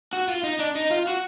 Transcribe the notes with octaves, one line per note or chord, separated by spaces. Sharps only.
F#4
F4
D#4
D4
D#4
F4
F#4